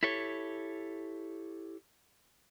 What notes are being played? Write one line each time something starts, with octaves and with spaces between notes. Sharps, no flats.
E4 G4 A4 C#5